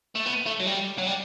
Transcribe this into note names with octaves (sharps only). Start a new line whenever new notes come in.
A3
B3
A3
F#3
G3
F#3
G3